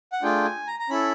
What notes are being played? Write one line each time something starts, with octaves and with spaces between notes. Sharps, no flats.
F#5
A3 D4 F4 G#4 G5
G#5
A#5
A#5
C#4 E4 A4 B5